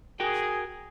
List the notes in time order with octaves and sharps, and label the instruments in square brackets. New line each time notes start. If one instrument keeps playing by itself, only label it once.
[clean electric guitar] F#4 A#4 G5 [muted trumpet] G#4